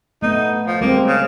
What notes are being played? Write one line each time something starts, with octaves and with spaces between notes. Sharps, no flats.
A3 B3 D#4
F3
G3 G#3 A#3 C4
C#3